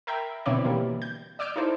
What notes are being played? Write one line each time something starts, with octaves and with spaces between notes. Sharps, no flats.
A#4 E5 G5 A#5 B5
B2 D3 C4 E4 C#5 D5
B2 E3 G3 A#3
G6
D5 D6 E6 F6 G6 D7
D#4 E4 A4 C5 D5